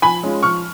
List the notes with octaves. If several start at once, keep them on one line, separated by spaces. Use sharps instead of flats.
F3 G#5 B5
G#3 C#4 F4
F3 C#6 F6